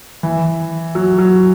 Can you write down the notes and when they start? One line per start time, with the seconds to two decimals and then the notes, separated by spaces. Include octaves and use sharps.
0.23 E3
0.95 F#3
1.18 F#3